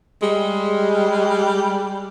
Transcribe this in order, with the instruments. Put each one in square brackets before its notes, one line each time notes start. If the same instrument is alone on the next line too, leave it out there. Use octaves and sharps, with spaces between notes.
[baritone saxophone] G3 [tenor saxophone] G#3